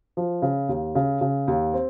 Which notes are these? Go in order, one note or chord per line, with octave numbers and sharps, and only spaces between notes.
F3
C#3
D#2
C#3
C#3
D#2
C4